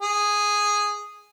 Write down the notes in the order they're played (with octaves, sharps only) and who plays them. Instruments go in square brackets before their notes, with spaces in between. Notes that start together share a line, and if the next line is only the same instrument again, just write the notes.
[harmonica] G#4